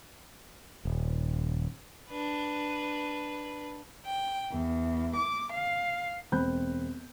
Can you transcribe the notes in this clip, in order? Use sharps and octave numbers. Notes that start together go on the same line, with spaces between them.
D#1
D4 B4
G5
E2
D6
F5
E1 C4 C5 B5 F#6 G6